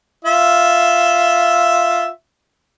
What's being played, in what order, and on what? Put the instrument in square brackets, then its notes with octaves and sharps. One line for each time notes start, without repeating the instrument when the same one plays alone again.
[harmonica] F4 E5